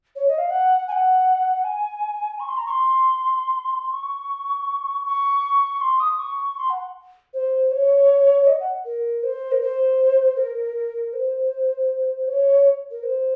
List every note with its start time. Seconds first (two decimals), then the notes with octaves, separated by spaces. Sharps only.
0.16 C#5
0.28 D#5
0.38 F5
0.50 F#5
0.88 G#5
0.92 F#5
1.64 G#5
2.40 C#6
2.48 C6
2.57 A#5
2.66 C#6
2.70 C6
3.92 C#6
5.06 C#6
5.81 C6
6.00 D#6
6.19 C#6
6.58 C6
6.70 F#5
7.34 C5
7.71 C#5
8.47 D#5
8.60 F#5
8.85 A#4
9.23 C5
9.52 A#4
9.61 C5
10.37 A#4
11.13 C5
12.27 C#5
12.91 A#4
13.03 C5